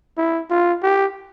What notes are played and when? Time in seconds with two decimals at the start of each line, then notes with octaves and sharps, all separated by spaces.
0.18 E4
0.50 F4
0.83 G4